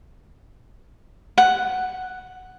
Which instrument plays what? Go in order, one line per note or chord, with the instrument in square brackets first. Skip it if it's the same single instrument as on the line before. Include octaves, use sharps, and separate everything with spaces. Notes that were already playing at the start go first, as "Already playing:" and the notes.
[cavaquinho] F#5